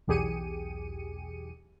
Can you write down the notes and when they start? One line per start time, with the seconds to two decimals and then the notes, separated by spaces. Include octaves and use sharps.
0.07 B1 E2 G4 G#4 C#7 D#7